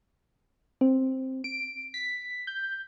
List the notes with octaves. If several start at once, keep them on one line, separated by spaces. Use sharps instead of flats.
C4
D7
B6
G6